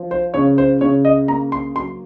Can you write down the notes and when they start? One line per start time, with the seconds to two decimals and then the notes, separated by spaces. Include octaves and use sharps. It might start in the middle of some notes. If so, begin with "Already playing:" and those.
Already playing: F3
0.11 C5
0.34 C#3 C#5
0.58 C5
0.81 C#3 C#5
1.05 D#5
1.28 A#3 A#5
1.52 C6
1.76 F#3 C6